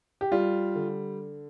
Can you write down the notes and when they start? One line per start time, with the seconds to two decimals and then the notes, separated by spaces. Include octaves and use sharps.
0.21 G4
0.32 G3 F4
0.75 D3